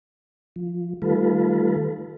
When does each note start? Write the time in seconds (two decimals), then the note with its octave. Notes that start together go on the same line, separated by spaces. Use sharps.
0.56 F3
1.02 D#3 G3 A3 F4 A4 B4